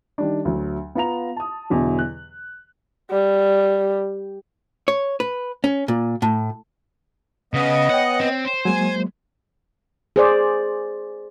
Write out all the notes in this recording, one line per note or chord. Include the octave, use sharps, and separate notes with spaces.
D#3 G3 D4
D2 F#3
B3 F4 F5 A#5 F7
A5 D#6
E2 B2 D3 E3 F#3
F#6
G3
C#5
B4
C#4
A#2
A2
C#3 B3 D#5
C#5 F#5 G5
C4
C5
F#3 G#3 A#3 G#5
G#4 C5 D5